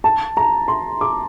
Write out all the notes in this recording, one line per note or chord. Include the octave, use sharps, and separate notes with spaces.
A5
A#5
C6
D6